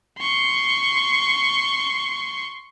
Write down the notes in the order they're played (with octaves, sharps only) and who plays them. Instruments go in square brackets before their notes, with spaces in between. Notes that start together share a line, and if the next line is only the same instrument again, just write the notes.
[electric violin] C6 C#6